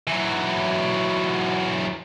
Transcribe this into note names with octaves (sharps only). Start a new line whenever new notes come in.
E3 F#3